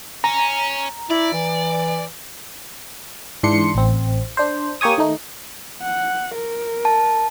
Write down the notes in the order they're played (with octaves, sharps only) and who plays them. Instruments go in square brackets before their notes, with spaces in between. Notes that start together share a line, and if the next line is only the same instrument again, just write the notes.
[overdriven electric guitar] C#4 [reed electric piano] A#5
[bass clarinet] E4 [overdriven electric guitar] D5
[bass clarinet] E3
[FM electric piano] G#2 E3 D4 C6 C#7
A1 C4
D4 C5
A#3 G4 C#5 G#5 D#6
D#3 A3 D#4
[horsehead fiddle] F#5
A#4
[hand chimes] A5